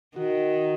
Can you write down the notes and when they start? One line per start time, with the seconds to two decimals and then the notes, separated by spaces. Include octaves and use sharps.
0.16 D#3 F#4